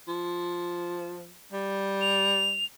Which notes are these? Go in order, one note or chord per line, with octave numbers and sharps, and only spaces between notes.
F3
G3
F7